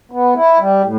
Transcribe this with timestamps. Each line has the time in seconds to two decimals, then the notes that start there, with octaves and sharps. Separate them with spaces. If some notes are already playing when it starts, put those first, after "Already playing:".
0.11 B3
0.36 E4
0.59 G3
0.84 A2